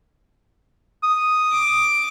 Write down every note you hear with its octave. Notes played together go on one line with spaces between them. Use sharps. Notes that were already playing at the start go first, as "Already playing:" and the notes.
D#6
D6